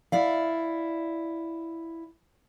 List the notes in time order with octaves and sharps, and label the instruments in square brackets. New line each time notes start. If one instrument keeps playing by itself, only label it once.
[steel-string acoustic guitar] E4 D5 F5